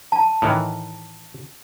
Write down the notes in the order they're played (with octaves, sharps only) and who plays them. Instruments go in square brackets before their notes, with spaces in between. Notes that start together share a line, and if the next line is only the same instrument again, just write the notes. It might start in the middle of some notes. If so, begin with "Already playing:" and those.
[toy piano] A5
[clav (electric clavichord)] A2 D#3 E3